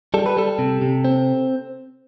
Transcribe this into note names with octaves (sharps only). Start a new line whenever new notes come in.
G3 A4
B4
G3 A4
C3
C3
C4